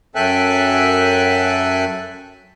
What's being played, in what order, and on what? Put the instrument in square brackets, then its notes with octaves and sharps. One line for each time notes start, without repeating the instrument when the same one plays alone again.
[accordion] F#2 A4 E5 G5 G#5 F#6